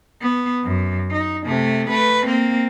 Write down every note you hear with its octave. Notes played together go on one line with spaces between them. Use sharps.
B3
F#2
D#4
C3 A3
A3 B4
A#3 C4